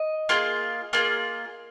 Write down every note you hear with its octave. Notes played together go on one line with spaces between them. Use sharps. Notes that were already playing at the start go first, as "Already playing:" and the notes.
Already playing: D#5
A#3 F4 G#4
A#3 F4 G#4